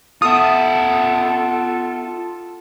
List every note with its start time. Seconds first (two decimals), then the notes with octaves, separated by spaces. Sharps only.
0.22 B3 F4 A4 E5 D#6